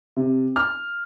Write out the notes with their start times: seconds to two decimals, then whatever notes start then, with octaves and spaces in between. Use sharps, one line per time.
0.16 C3
0.56 F6